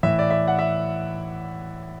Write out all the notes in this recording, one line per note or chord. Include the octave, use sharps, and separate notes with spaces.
A2 E3 E5
D5
E5
F#5
E5